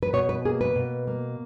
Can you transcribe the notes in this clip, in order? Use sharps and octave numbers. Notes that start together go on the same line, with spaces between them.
B4
B2 C#5
B4
A#3 G#4
B4
B2
A#3